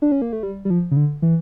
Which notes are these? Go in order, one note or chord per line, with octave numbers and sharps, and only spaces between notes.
D4
C#4
A#3
A3
G3
G3
F3
C#3
D3
E3